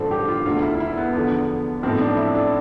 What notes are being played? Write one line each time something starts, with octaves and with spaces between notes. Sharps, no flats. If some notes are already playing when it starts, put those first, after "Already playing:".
Already playing: A1 G2 D3 F3 A4 C5
G4
F4
E1 D2 D3 F4
E4
E4
B3
E2 D3 F3
B1 A2 F3 C4
D4
E4
D4